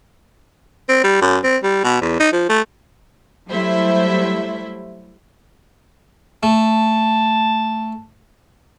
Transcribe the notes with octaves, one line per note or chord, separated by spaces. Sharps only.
C4
G3
F#2
C4
G3
B2
E2
D#4
F3
A3
F#3 G3 A3 E4 C5 E5
A3 A5